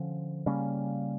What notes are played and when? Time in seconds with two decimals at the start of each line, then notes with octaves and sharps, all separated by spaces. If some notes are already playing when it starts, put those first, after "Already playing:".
Already playing: D3 F3 C#4
0.46 C#3 G3 A#3 C#4